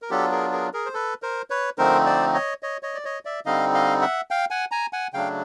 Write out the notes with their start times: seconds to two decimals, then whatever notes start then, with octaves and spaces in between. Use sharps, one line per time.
0.02 A#4
0.10 F#3 B3 D4 F4 G4 A4
0.31 G#4 A#4
0.52 G#4 A#4
0.73 G#4 A#4
0.86 C5
0.94 A4 B4
1.22 A#4 C5
1.50 B4 C#5
1.78 D3 F3 A3 C4 D#4 A#4 C5
2.06 C5 D5
2.34 C#5 D#5
2.63 C#5 D#5
2.83 C#5 D#5
2.95 D5
3.05 C#5 D#5
3.25 D5 E5
3.46 D3 G3 C4 D#4 D#5 F5
3.74 D#5 F5
4.01 E5 F#5
4.31 F5 G5
4.50 F#5 G#5
4.71 G#5 A#5
4.93 F#5 G#5
5.14 C#3 F#3 A3 D4 F5 G5